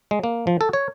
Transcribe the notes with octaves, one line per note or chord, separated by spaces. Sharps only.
G#3
A#3
F3
A4
C#5